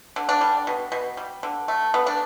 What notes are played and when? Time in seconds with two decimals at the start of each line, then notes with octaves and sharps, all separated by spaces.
0.16 D3
0.29 D4
0.41 G3
0.67 B2
0.92 B2
1.17 G3
1.43 D3
1.68 A3
1.94 A3 B3
2.06 D4